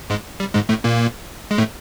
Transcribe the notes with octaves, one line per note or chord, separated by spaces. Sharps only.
G#2 G#3
G3
G#2 G#3
A2 A3
A#2 A#3
G#3
A2 A3